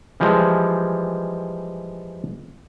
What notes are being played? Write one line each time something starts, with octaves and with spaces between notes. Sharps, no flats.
E3 F3 G3 G#3